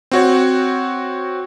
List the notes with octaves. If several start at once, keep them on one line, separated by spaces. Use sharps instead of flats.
C4 F#4 C#5